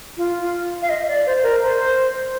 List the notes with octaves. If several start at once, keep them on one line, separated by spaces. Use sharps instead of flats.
F4
F5
D#5
D5
C5
A#4
C5